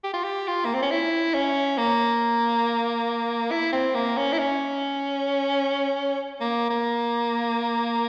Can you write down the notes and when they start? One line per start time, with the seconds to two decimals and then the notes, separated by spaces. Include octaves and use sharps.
0.03 G4
0.13 F4
0.24 G4
0.48 F4
0.65 A#3
0.74 C4
0.82 C#4
0.91 E4
1.34 C#4
1.78 A#3
3.51 E4
3.72 C4
3.95 A#3
4.17 C#4
4.33 E4
4.39 C#4
6.40 A#3
6.70 A#3